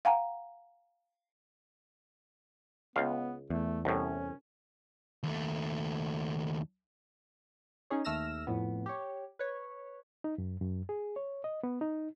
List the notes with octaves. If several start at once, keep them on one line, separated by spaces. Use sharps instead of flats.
F5 F#5 G#5 A#5
C#2 B3 F5
E2 A3
C2 A2 C#4
D#2 A3
C#4 D#4 G#4 C#5
D#2 A3 E6 F6 A#6 E7
F2 A2 B3
G4 C#5
B4 C#5
D#4
F#2
F#2
G#4
C#5
D#5
B3
D#4